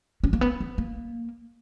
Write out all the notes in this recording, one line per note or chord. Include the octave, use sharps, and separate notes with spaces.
C#4
A#3
B3
B3
A#3